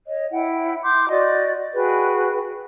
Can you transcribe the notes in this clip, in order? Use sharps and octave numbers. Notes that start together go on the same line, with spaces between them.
C#5 D#5
E4 F#5 G5
C6 D6 G6
F#4 D5 D#5
F#4 G#4 B4 G5